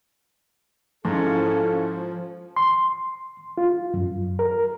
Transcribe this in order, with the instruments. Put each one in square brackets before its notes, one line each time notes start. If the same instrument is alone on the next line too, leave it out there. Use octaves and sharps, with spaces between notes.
[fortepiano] G#2 [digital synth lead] F3 [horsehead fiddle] C#4 E4 [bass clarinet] A4
[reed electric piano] C6
F4
F#2
A#4